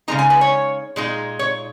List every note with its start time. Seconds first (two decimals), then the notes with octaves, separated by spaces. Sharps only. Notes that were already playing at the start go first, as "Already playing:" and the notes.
0.08 C#3 G#3 D#4 A#5
0.19 G#5
0.30 B4
0.41 C#5
0.96 A#2 G#3 D#4
1.39 C#5